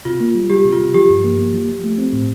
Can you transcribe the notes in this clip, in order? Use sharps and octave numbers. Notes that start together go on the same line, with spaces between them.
C3 F4
A#3
G3
G3 G4
C3
F4
C3
F3 G4
G2
A#3
A#3
F3
F3
A3
C4
A2